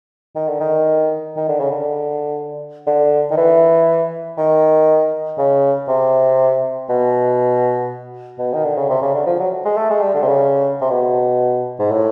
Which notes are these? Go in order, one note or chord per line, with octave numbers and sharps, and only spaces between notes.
D#3
D3
D#3
D#3
D3
C#3
D3
D3
D#3
E3
D#3
C#3
C3
B2
B2
D#3
D3
C#3
C3
C#3
D3
F3
F#3
G#3
A3
G#3
G3
D3
C3
C#3
C3
B2
G#2
A2